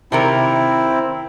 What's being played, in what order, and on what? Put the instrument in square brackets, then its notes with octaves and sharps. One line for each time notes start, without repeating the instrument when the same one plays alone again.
[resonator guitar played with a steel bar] C3 D#3 A#4 [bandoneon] C4 E4